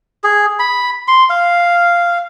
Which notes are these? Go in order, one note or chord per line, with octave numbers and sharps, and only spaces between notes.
G#4
B5
C6
F5